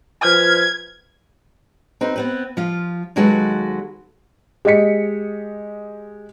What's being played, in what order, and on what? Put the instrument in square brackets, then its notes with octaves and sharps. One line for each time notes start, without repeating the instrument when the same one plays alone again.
[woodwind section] F3 B4 F6 [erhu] G#6
[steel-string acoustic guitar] C4 D#4 B4
B3 C4 B4
F3 F4
D#2 F#3 G#3 F#4 A4 B4
[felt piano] G#3 G4 D#5 B6 C#7